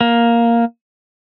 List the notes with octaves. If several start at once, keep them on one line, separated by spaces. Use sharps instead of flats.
A#3